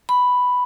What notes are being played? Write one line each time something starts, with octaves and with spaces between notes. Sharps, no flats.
B5